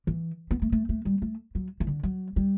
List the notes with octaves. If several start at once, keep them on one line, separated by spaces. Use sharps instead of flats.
E3
B3
A3
A3
A3
G3
A3
F#3
E3
D3
F#3
G3